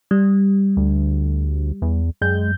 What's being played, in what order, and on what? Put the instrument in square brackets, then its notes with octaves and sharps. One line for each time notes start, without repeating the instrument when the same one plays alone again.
[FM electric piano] G3
[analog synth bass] D2
E2
[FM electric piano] F#2 G6 [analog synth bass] G#3